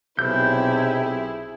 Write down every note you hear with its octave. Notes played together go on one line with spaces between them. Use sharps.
B1 C3 E4 G#4 G6